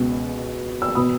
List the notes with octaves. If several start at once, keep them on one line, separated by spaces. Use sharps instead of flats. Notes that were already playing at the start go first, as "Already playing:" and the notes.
Already playing: C#2 B2
E6
B2 B5 D#6